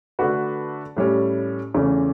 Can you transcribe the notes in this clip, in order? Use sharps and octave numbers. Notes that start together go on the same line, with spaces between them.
D3 A3 D4 F#4 B4
A2 G3 C#4
E2 C#3 E3 A3 C#4